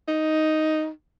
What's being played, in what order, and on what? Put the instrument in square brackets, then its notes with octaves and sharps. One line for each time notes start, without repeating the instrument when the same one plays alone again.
[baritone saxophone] D#4